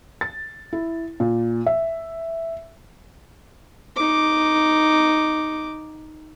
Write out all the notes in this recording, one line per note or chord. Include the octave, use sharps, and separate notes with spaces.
A6
E4
A#2
E5
D#4 D6